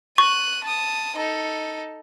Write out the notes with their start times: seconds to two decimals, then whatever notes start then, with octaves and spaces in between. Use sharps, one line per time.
0.18 C#6 F#6 D#7
0.63 A5 D#6
1.16 D#4 A4